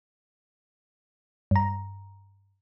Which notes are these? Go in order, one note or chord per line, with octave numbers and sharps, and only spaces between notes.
G2 A#5